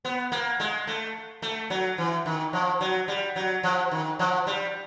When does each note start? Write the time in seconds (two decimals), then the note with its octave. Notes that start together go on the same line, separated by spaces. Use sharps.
0.05 B3
0.32 A#3
0.60 G#3
0.87 A3
1.42 A3
1.70 F#3
1.98 E3
2.26 D#3
2.53 F3
2.81 F#3
3.08 G3
3.36 F#3
3.63 F3
3.91 D#3
4.19 F3
4.47 G3